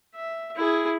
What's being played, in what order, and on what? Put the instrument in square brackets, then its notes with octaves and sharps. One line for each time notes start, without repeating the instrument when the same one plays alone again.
[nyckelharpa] E5
E4 G#4